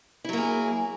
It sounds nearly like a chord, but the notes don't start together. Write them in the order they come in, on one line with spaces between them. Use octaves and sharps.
E4 F#3 A#3 G#4